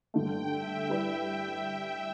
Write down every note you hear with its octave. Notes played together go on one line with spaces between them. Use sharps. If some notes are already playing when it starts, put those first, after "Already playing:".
G2 D3 A3 G5
E5
G3 E4 B4 D5